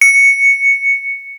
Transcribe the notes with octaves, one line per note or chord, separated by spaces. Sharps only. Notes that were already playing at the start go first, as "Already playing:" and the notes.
C#7